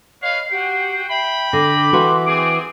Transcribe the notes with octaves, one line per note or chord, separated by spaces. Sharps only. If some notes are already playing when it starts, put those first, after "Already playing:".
B4 C#5 D#5 F5 C7
F#4 G4 F#5 G5
E5 G5 B5
D3 D6 A#6
E3 F#4 C6
C4 G#4 D7